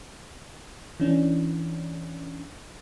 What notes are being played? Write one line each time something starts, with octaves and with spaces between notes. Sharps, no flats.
E3 C#4 D4